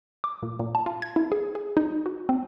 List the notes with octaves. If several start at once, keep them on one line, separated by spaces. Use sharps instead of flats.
D6
A#2
A#2
A5
F4
G#6
E4
G#4
G#4
D#4
F#4
C4